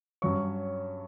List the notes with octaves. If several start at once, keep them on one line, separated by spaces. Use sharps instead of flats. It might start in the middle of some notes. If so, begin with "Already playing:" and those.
G2 F#3 C#4 C#6